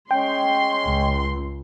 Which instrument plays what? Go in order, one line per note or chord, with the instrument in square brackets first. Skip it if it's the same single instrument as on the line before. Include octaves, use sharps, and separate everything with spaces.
[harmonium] G#3 C#4 [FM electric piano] G5 [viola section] C6
[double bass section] C#2